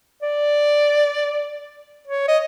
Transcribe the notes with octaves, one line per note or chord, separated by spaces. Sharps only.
D5
C#5
D#5